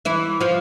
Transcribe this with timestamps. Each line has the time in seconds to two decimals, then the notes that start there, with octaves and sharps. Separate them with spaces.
0.05 E3 E4
0.41 F3 F4